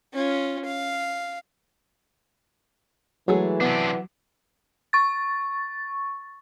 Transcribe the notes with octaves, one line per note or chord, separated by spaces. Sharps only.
C#4 F4
F5
E3 F#3 G#3 A3 G#4
C3 B3 D4
C#6 A6